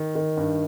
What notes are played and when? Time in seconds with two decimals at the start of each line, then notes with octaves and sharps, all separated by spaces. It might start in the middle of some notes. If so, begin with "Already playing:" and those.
Already playing: D#3
0.15 D#3
0.37 G2